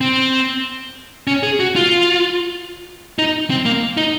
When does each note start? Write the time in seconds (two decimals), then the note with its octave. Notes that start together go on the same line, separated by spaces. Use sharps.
0.01 C4
1.27 C#4
1.43 G#4
1.60 F#4
1.76 F4
3.19 D#4
3.50 C4
3.65 A#3
3.97 D#4